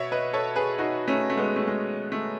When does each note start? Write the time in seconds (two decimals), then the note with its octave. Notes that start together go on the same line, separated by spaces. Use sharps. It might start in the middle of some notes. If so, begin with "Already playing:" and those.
Already playing: B2 C#5 E5
0.12 B4 D#5
0.33 A4 C#5
0.56 G#4 B4
0.78 D#4 F#4
1.08 A3 C#4
1.30 A3
1.37 G#3 B3
1.56 A3
1.67 G#3
2.12 A3